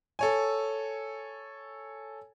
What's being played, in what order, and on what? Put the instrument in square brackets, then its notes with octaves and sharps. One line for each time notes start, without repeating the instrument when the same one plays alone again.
[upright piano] A4 C#5 G#5